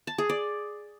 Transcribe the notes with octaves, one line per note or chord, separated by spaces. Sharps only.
A5
G#4
D5